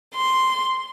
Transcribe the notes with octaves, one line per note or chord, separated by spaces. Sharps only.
C6